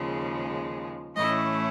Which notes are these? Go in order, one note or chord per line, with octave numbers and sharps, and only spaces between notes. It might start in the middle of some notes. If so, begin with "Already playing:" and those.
Already playing: D#2 C#3 F3 G#3
A2 E3 A3 C#4 E4 D#5